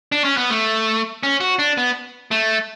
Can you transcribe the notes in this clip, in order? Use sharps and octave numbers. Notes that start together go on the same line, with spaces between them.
D4
C#4
B3
A3
C#4
F#4
D4
B3
A3